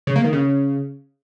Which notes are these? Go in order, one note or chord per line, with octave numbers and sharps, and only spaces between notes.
C#3
A#3
D#3
C#3